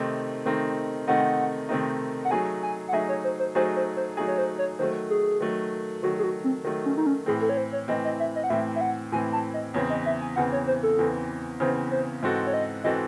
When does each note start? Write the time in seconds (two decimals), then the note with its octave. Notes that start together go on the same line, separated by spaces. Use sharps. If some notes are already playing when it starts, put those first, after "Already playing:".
Already playing: C3 D#3 A3 C4 D#4
0.45 C3 D#3 A3 C4 D#4
1.08 C3 D#3 A3 C4 D#4 F#5
1.69 C3 D#3 A3 C4 D#4
2.25 F#5
2.31 F#3 A3 D#4 G#4 G#5
2.63 G#5
2.88 F#5
2.92 F#3 A3 D#4 G#4 E5
3.09 C#5
3.24 C5
3.39 C5
3.55 F#3 A3 D#4 G#4 C5
3.76 C5
3.96 C5
4.17 F#3 A3 D#4 G#4
4.28 C#5
4.38 C5
4.58 C#5
4.79 D#3 F#3 A3 C5
5.10 G#4
5.40 D#3 F#3 A3
6.03 D#3 F#3 A3 F#4
6.19 G#4
6.24 F#4
6.44 C4
6.64 D#3 F#3 A3
6.85 C#4
6.97 D#4
7.06 C#4
7.26 A2 E3 C4 G#4
7.42 A4
7.49 C#5
7.57 C5
7.73 C#5
7.88 A2 E3 C4 D#5
8.05 D#5
8.20 E5
8.36 D#5
8.44 F#5
8.50 A2 E3 C4 E5
8.76 E5
8.81 F#5
9.12 A2 E3 C4 G#5
9.33 A5
9.54 D#5
9.74 E2 C#3 E3 C4 C#5
9.90 D#5
10.06 E5
10.21 G#5
10.36 E2 C#3 E3 C4 F#5
10.52 C#5
10.67 C5
10.83 A4
10.99 E2 C#3 E3 C4
11.60 E2 C#3 E3 C4 C5
11.91 C5
12.23 G#2 E3 C4 F#4 A4
12.47 C#5
12.54 D#5
12.84 E3 C4 F#4 A4 D#5